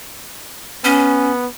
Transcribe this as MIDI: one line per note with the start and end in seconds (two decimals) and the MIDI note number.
0.85 1.47 59
0.85 1.30 61